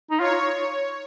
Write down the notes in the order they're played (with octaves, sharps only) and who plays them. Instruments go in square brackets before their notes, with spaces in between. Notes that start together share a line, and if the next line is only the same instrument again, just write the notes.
[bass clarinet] D#4
[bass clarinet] F4 [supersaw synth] C#5